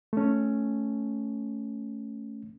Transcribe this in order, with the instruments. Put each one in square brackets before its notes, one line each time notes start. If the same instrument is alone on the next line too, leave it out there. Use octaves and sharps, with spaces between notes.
[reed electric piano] A3 C#4